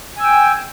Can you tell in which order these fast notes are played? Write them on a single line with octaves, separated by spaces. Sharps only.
G#5 E6 G5